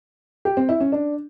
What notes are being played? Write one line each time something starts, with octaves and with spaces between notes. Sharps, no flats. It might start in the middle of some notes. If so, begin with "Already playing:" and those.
G4
C4
E4
C#4
D4